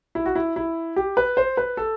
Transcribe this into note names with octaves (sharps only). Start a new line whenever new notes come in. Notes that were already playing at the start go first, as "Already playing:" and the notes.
E4
F#4
E4
E4
G4
B4
C5
B4
A4